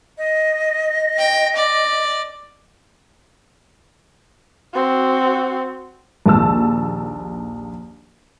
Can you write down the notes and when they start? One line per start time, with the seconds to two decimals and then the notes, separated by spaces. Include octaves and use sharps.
0.18 D#5
1.18 G5
1.56 D5
4.74 C4 F#4
6.26 A#1 D#2 A5 E6